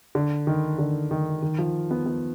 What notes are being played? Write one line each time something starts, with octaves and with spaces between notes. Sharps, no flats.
D3
D#3
D3
D#3
D#3
F3
B3
B3